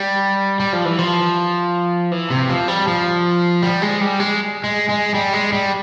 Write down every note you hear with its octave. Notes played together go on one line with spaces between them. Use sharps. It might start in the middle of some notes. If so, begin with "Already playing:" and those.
Already playing: G3
G3
F3
E3
F3
E3
C3
F3
G3
F3
G3
G#3
G3
G#3
G#3
G#3
G3
G#3
G3